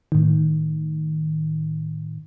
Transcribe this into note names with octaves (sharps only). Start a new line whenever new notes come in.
A2 D#3